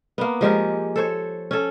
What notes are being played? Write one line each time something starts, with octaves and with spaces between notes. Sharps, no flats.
A#3 B3
F3 G#3 G4 A#4
A4 C5 C#5
C#4 A4